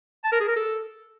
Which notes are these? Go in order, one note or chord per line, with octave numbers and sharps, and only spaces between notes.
A5
A#4
G#4
A#4
A4